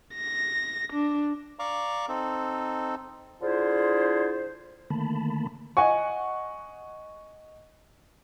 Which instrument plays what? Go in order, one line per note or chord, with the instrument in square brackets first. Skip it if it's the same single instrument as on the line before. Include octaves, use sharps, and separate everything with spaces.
[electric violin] A#6
D4
[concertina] D5 F5 A#5 C#6 D6
C4 D#4 A4
[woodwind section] D3 D4 E4 F4 G#4 C5
[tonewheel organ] D3 D#3 A3 A#3 A5 B5
[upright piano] D#5 F#5 G#5 C#6